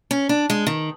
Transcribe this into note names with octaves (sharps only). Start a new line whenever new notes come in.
C#4
D4
G#3
D#3